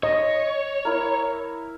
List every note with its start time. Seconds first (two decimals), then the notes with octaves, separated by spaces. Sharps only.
0.03 C#5 D#5
0.85 E4 A#4